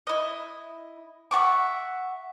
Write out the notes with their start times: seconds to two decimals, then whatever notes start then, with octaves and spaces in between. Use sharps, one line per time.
0.07 E4 D#5
1.31 E5 F#5 C#6 D6